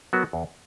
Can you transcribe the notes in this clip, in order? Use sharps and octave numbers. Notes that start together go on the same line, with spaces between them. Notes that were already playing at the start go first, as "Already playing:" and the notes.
F#3 B3 F#4 A#4
E2